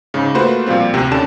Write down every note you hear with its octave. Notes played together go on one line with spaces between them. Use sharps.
G#2 C#3
A3 A#3 F4 F#4 B4 C5
A#2 F3 G3 C4 F4
D2 C3 C4
D#2 D3 C#4 A5 E7